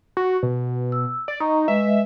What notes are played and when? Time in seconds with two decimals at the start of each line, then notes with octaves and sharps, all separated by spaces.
0.17 F#4
0.43 B2
0.92 E6
1.28 D5
1.40 D#4 D#5 A#5 C#6
1.68 G#3 B4 D#5 E5